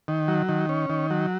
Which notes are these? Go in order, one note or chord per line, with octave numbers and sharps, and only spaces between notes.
D#3
F#3
D#3
C#4
D#3
F#3